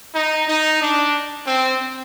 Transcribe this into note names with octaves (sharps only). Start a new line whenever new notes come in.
D#4
D#4
D4
C4